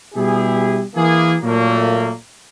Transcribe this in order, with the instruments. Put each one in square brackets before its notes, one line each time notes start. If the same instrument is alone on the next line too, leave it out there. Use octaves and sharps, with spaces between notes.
[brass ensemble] B2 G3 E4 G4 G#4
E3 A#3 G#4
A#2 F#3 A3 A#3